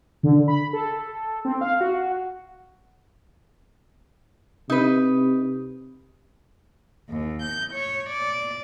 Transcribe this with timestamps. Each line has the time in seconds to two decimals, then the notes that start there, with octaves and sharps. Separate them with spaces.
0.23 D3
0.48 B5
0.73 A4
1.45 C4
1.61 F5
1.81 F#4
4.70 C3 D#4 B4
7.09 D#2
7.42 G6
7.74 C#5
8.09 D5